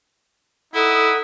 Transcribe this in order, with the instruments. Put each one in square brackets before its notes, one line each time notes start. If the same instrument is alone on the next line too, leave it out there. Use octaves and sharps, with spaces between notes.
[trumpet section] D#4 F#5 D#6 [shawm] E4 [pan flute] A4